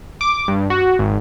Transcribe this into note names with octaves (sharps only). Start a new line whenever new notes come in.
D6
G2
F#4
G#1